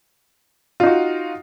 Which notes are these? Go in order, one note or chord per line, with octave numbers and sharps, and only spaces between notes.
D#4 F4 F#4